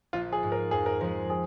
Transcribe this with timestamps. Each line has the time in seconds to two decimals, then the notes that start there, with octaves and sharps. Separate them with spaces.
0.13 A#1 F4
0.32 G#4
0.43 G#2 G#3
0.52 A#4
0.71 F2 G#4
0.86 A#4
1.01 F3 A#4
1.04 G#3
1.30 G#4